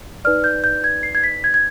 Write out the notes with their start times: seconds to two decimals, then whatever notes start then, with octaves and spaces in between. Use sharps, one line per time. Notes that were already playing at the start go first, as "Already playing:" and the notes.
0.25 D#4 B4 D5 F6
0.44 G6
0.64 G6
0.84 G#6
1.03 C7
1.15 G#6
1.23 B6
1.44 G#6
1.54 G#6